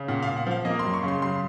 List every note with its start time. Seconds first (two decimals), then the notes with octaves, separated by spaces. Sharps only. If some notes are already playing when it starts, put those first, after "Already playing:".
Already playing: C#3
0.08 A#2 F#5
0.22 A#2 F5
0.36 F#5
0.47 F3 F5
0.65 A#3 D#5
0.79 C6
0.84 F#2
0.94 C#6
1.03 C#3
1.08 C6
1.22 F#2 C6